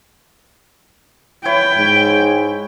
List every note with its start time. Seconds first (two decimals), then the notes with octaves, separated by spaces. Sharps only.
1.45 E4 B4 C#5 G5
1.78 G#2